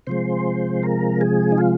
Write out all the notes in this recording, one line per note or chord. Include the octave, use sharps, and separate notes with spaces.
C3 F3 G#3 C5
A#4
G#4
D#4
F4